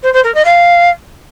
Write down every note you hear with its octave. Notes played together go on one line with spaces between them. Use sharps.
C5
C5
A#4
D#5
F5